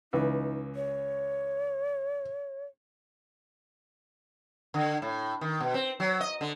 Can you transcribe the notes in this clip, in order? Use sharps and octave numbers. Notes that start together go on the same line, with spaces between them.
C#2 E3 D#4
C#5
D3
A2
D#3
B2
C4
F#3
D#5
D3